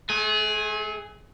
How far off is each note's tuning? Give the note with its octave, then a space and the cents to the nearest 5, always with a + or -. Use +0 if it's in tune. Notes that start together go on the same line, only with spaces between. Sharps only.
A3 -45 G#4 +0